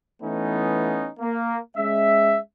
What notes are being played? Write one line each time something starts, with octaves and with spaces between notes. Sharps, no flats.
E3 A3 B3 C#4 D#4
A#3
G#3 C#4 E5